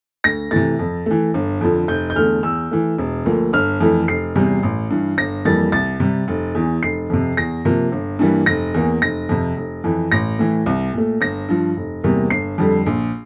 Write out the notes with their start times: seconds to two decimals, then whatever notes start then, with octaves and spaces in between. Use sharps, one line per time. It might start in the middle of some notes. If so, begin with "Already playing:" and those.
0.24 D2 A#6
0.51 C3 E3 A3 A6
0.79 F2
1.06 E3 A3
1.34 G1
1.61 F2 D3 F3
1.88 F1 G6
2.10 G6
2.15 E2 D3 A3 F6
2.43 E2 E6
2.71 E3 A3
2.99 E1
3.25 D2 D3 F3 A#3
3.53 G1 F6
3.80 F2 E3 A3
4.08 F1 C7
4.36 E2 C3 G3
4.63 A1
4.91 G2 E3
5.18 G1 A#6
5.45 F2 E3 G3 A#3 A6
5.72 C2 A6
6.00 C3 G3
6.28 F1
6.55 E2 E3
6.83 F1 C7
7.10 F2 C3
7.37 E2 A#6
7.65 C3 F3 A#3
7.92 G1
8.19 G2 E3 G3 A#3
8.46 F1 A#6
8.74 E2 E3 A#3
9.02 F1 A#6
9.29 F2 C3
9.57 F1
9.84 F2 E3
10.12 A1 A#6
10.39 A2 E3
10.66 C2
10.93 A#2 A3
11.21 G1 A#6
11.49 G2 F3
11.77 F1
12.04 E2 C3 G3 A#3
12.30 G1 C7
12.58 F2 D3 G3
12.86 A#1